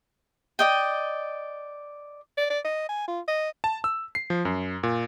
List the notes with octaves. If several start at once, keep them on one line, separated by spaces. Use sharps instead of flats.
D5 D#5 G5
D5
D5
D#5
G#5
F4
D#5
A5
E6
C7
F3
F#2
A#2